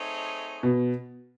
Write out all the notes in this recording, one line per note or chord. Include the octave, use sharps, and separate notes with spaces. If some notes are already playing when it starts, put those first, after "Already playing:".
Already playing: A3 C4 D#4 G#4 C#5
B2